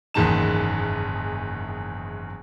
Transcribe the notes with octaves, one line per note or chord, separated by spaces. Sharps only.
F#1 E2 G#2 D#3 A5 E7